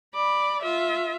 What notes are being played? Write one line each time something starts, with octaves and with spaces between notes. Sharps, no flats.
D5 B5
F4 E5